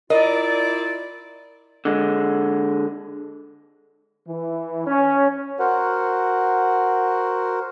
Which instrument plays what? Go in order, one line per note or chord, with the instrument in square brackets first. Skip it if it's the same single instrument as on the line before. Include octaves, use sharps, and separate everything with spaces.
[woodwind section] E4 F4 D5 [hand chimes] A#4 [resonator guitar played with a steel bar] D#5
[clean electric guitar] D3 G#3
[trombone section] E3
C#4
[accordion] F#4 A#4 C5 F#5